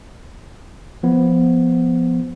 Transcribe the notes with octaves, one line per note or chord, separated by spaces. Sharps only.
F3 B3